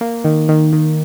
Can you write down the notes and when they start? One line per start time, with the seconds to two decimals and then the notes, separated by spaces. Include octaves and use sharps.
0.01 A#3
0.24 D#3
0.49 D#3
0.73 D#3